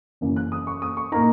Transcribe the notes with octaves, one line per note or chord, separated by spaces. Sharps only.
F#1 F#2 E3
F#6
D#6
C#6
D#6
C#6
A#2 A#3 D#4 A#5